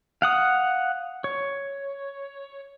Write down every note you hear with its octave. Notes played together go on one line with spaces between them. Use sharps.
F5 F#5 D#6
C#5